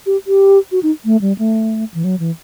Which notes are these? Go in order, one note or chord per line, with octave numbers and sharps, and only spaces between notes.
G4
G4
F#4
D#4
A3
G3
A3
E3
F#3
E3